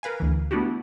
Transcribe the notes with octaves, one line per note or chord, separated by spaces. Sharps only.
A#4 B4 F5 G#5
D2 E3
A3 B3 D4 E4 F#4 G4